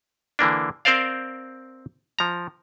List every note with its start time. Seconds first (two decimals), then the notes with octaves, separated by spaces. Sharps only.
0.39 D3 E3 A#3 D4
0.85 C4 A#4 C5 D5 F5
2.19 F3 A#5